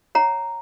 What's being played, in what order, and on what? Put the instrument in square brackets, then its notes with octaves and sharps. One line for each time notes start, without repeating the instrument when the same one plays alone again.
[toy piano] C#5 F#5 A#5